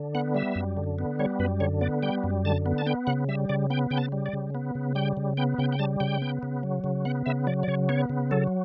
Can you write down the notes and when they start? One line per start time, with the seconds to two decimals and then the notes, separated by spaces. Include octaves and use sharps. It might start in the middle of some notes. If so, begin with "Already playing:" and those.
Already playing: D3
0.15 B3 F#5
0.35 G3 E5
0.55 F#2
0.77 D3
0.99 B3
1.19 G3 C#5
1.39 F#2 B4
1.60 D3 C#5
1.81 B3 D5
2.03 G3 G5
2.24 F#2
2.45 D3 A5
2.66 B3
2.78 A5
2.86 B3 G5
3.07 C#3 F#5
3.28 G3 E5
3.49 C#3 D5
3.70 B3 G5
3.91 C#3 G5
3.98 A5
4.12 G3
4.26 D5
4.33 C#3
4.55 B3
4.75 C#3
4.95 G3 G5
5.17 C#3
5.37 B3 G5
5.58 C#3 G5
5.72 G5
5.79 G3 A5
6.00 C#3 G5
6.22 B3
6.43 C#3
6.63 F#3
6.84 C#3
7.05 B3 F#5
7.26 C#3 E5
7.47 F#3 D5
7.63 D5
7.68 C#3 C#5
7.89 B3 C#5
8.09 C#3
8.31 F#3 A4